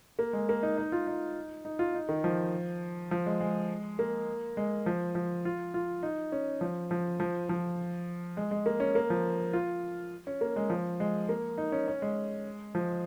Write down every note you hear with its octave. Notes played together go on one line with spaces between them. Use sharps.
A#3
G#3
A#3
D#4
D#4
F4
D#4
D#4
F4
D#4
D#3
F3
F3
G#3
G#3
A#3
G#3
F3
F3
F4
F4
D#4
C#4
F3
F3
F3
F3
G#3
G#3
A#3
C#4
A#3
F3
F4
C#4
A#3
G#3
F3
G#3
A#3
D#4
C#4
C#4
G#3
F3